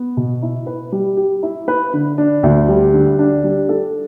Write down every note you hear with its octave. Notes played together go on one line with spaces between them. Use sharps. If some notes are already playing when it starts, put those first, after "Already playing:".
Already playing: B3
B2
E4
B4
G3
G4
E4
B4
D3
D4
D2
G3
D3
D4
G3
A4